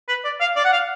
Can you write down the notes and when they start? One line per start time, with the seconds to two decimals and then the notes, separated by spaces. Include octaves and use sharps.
0.09 B4
0.25 D5
0.41 F5
0.56 D5
0.65 F#5
0.73 F5